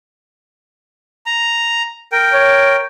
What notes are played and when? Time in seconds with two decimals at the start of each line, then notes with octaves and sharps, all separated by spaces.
1.26 A#5
2.12 A#4 G5
2.33 C#5